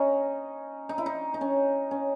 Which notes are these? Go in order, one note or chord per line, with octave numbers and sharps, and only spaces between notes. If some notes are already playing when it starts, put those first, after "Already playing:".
Already playing: C#4 D#4
D#4
E4
D#4
D#4
C#4
C#4